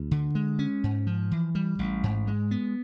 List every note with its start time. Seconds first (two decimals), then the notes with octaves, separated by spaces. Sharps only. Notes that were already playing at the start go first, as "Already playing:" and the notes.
Already playing: D2
0.11 D3
0.35 G#3
0.59 C#4
0.84 G#2
1.07 F3
1.31 E3
1.55 G3
1.79 A1
2.03 G#2
2.27 G#3
2.51 B3